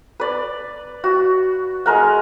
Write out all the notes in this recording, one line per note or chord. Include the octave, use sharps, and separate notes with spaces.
B4 D5
F#4
G#3 A#4 F#5